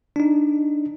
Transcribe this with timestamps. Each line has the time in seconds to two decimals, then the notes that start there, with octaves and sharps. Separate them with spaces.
0.16 D4 D#4